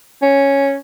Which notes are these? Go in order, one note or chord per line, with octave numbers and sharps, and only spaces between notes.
C#4